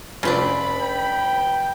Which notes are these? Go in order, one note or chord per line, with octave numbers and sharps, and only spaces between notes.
F1 C#3 C4 D4 F4 B5
G5